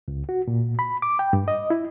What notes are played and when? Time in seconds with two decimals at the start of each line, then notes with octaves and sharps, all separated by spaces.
0.08 C#2
0.29 F#4
0.47 A#2
0.79 B5
1.02 D6
1.19 G5
1.33 G2
1.48 D#5
1.70 E4